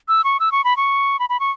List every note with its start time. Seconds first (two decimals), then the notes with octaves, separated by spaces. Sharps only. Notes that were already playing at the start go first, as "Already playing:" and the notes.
0.08 E6
0.24 C#6
0.40 E6
0.52 C#6
0.64 B5
0.77 C#6
1.19 B5
1.29 B5
1.40 C#6